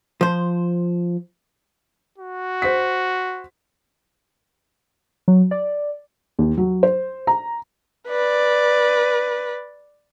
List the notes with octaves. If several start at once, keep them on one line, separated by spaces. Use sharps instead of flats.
F3 C5
F#4
C5 B6
F#3
D5
D#2
F#3
C5
A#5
B4 D5